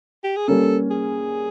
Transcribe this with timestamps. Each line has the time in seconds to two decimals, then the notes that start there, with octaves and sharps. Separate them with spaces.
0.23 G4
0.36 G#4
0.48 G3 A#3 C#4 A4
0.90 G#4